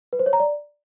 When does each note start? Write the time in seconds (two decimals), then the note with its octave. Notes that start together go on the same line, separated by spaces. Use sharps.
0.13 B4
0.19 C5
0.26 C#5
0.33 A#5
0.40 D5